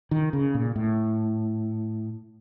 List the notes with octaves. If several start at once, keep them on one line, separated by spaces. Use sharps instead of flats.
D#3
C#3
A#2
A2